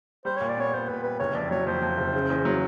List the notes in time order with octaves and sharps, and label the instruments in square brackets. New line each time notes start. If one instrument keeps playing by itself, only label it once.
[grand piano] G3 [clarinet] C5
[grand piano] A#2 [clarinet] C#5
[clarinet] D5
[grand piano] B3 [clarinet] C#5
[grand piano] A#2 [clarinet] C5
[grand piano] A#2 [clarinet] B4
[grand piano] G3 [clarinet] B4
[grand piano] F#1 [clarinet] C#5
[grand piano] F2 [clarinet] D5
[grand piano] F#3 [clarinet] C#5
[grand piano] F2 [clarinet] C5
[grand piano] F2
F#1
C#3
E2
F#3